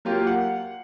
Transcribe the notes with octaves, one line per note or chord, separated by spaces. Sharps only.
F#3 A#3 F4 G4
F#5